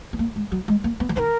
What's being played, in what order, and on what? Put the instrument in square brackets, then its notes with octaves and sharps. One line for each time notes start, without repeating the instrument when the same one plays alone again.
[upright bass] B3
A#3
G#3
F#3
G#3
A#3
B3
F3
[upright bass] D#3 [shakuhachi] A#4 C5